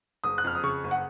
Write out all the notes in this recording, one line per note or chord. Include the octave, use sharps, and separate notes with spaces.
F#1 D#6
F#6
F2 F6
D#6
C#3 C#6
F#1
F#5